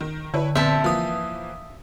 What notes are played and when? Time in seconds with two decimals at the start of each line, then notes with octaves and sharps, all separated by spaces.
0.01 D#3
0.34 D3 E4 B4 C#5
0.55 A#1 D3 B3 C4 E5 A5 B6
0.84 E3 F3 A#3 F5 D#6